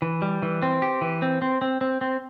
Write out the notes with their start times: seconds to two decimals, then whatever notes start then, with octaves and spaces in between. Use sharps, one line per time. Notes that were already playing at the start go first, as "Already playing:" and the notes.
0.02 E3
0.22 G3
0.42 E3
0.62 C4
0.82 G4
1.01 E3
1.22 C4
1.42 C4
1.62 C4
1.81 C4
2.01 C4